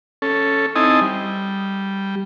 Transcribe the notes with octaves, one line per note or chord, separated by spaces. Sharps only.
C#4 A4
C4 D#4 E4 D#5 G#5 A5
G3